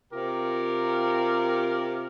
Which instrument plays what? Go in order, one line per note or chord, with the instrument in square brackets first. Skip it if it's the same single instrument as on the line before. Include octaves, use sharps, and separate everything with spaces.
[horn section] C3 F4 G4 A#4